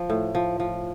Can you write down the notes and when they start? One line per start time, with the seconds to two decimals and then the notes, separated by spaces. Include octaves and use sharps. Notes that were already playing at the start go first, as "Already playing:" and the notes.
Already playing: F3
0.10 A2
0.35 F3
0.60 F3